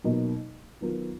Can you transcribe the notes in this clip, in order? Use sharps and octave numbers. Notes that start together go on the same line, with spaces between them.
B2 F#3 A#3 D#4
D#3 F#3 B3 F4 A#4